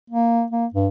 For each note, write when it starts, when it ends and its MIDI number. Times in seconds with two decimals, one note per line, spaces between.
0.10 0.44 58
0.51 0.66 58
0.74 0.88 43